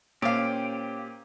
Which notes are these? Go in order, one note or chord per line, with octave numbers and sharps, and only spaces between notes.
A#2 C#4 G4 C5 C#5 F5 D6